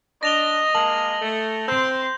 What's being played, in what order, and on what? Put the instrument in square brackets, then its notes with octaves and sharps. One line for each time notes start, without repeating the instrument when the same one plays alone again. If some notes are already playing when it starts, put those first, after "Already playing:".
[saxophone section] D4 [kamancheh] D#5 [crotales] A#6 F7 G7
[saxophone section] G#3 A#3 [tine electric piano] A5 [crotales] F#7
[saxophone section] A3
[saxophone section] C4 [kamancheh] C6 [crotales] G6